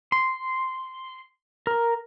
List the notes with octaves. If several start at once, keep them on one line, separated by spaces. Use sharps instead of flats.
C6
A#4